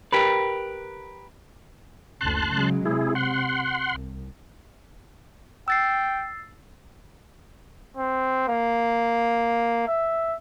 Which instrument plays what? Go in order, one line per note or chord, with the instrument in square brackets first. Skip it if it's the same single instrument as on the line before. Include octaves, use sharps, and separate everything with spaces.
[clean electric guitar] G4 A#4 B4
[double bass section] F#1 D2 [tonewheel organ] A5 C6 F#6
[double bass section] C#3 F#3 G#3
[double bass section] C3 [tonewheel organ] E4 G#4
[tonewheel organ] F#5 C6
[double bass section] C2
[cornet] G5 [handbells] E6 A6 C7
[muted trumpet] C4
A#3
E5